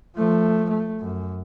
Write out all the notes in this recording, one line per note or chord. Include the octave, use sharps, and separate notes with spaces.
F3 A3
A3
F#2